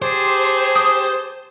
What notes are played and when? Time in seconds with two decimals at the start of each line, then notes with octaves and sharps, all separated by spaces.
0.02 G4 G#4 C5 A5 D6
0.76 D#6